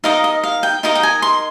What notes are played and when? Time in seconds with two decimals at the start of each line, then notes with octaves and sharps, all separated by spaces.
0.04 D#4 A#4 D#5 F5
0.24 D#5
0.44 F5
0.63 G5
0.83 D#4 A#4 D#5 F5
0.95 G5
1.03 G#5
1.22 C6